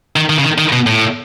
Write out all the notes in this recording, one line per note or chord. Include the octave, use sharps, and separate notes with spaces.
D#3
D#3
C#3
D#3
D#3
B2
A2